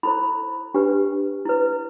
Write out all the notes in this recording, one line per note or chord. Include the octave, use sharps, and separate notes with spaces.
E4 A4 C5 B5
D4 G4 B4
E4 B4